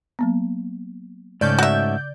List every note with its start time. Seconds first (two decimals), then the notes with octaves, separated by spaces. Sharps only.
0.19 F#3 A#3 B3
1.41 G#2 C#3 A3 C#4 D5 G6
1.59 F#4 E5